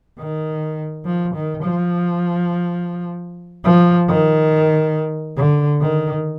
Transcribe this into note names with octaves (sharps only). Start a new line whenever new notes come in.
D#3
F3
D#3
F3
F3
D#3
D3
D#3